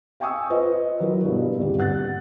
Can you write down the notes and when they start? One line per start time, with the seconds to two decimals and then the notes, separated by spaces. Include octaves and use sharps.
0.20 F5 G5 G#5 C#6 D#6 E6
0.50 F4 B4 C5 D#5
1.00 F#3 E4 A#4
1.25 G2 B2
1.58 D#1 G#1 D3 G4
1.79 F#5 F#6 A6